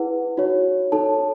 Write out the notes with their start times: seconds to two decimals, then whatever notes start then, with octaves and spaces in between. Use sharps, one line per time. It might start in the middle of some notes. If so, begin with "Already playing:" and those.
Already playing: E4 G#4 B4 F#5
0.37 D#4 F#4 C#5
0.92 D#4 A4 C#5 A5